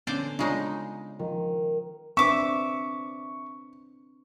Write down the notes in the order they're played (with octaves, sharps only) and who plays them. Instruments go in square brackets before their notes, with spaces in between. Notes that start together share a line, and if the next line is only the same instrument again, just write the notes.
[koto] D3 C5 D5 [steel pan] B3 C#4
[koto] C#3 G#3 D#4 [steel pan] D4 F4 C#5
[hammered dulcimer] D#3 [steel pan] F3 F4
[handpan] C4 D4 B4 [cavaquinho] E5 D6 [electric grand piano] C#6